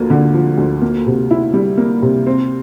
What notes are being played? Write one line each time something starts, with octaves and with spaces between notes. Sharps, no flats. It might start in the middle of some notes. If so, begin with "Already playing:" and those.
Already playing: D2 F3 A#3
D3
F3
D2
A#3
C3
E4
G3
A#3
C3
C4